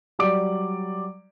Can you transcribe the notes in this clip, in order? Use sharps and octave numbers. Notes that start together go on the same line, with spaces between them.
F#3 G3 D5 D6 D7